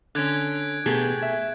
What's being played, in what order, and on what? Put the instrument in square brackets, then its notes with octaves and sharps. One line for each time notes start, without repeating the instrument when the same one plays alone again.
[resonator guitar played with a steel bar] D3 C#4 [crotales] F#6 G#6 D7
[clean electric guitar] B2 B3 [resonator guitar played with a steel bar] A3 G4 G#4
[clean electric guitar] E5